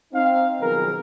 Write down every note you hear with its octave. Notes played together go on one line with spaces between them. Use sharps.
C4 D#4 F5
B1 D#3 F3 B3 G#4 A#4